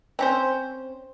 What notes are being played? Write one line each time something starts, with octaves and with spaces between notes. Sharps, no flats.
C4 C#4 C5